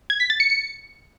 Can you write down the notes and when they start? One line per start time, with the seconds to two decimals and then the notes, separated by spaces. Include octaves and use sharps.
0.10 G#6
0.20 B6
0.30 A6
0.40 C#7
0.50 C#7